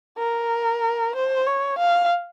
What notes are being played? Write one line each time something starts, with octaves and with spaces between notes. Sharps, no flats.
A#4
C5
C#5
F5